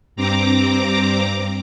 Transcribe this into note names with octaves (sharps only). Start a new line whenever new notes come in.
G2 C4 A#5 D6